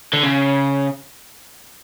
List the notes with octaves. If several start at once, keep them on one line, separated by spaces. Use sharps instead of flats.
D3
C#3